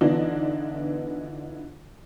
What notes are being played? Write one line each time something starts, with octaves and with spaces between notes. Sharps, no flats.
D3 E3 B3 D4 D#4 F4